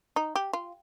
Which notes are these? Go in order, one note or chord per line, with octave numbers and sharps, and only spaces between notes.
D#4
G4
F4